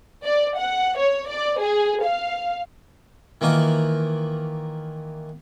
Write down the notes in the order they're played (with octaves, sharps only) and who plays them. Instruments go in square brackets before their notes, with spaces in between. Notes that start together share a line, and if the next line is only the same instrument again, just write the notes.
[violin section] D5
F#5
C#5
D5
G#4
F5
[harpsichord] D#3 E3 A#3 F4